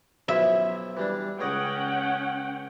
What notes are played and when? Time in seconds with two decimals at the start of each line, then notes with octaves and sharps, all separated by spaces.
0.28 B1 F3 E4 E5
0.97 E3 G3 D4
1.40 C#2 C#4 C#5 D#5 F#5 G5